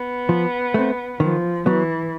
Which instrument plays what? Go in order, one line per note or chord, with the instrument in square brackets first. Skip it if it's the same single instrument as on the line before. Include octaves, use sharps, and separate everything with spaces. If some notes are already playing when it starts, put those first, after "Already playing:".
Already playing: [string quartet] B3
[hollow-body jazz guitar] F3
A3 C4
[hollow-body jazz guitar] D#3 [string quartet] F3
[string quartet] E3 [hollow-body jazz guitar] F#3 B3